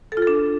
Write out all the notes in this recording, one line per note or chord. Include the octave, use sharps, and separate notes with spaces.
A4
F4
A4
D4